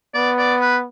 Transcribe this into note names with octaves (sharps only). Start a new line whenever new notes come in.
B3 D5
D5
B4